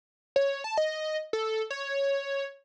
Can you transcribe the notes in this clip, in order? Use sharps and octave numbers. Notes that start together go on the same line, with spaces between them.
C#5
A5
D#5
A4
C#5